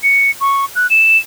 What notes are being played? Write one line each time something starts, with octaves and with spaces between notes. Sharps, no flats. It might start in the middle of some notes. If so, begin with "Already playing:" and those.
C#7
C#6
F#6
E7